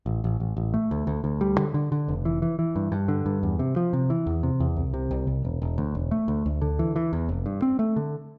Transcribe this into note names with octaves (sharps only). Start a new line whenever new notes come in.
A1
A1
A1
A1
A3
D2
D2
D2
G3
D3
D3
D3
F1
E3
E3
E3
G2
G2
D3
G2
E2
C3
F3
C3
E3
E2
C3
E2
C2
C3
C2
C2
E1
E1
D2
E1
A3
D2
D2
D3
E3
E3
E2
F1
G2
C4
A3
D3